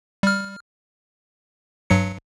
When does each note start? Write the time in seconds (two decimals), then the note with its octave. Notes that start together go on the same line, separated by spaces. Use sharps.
0.23 G3 F6
1.90 G2 F#3 C#7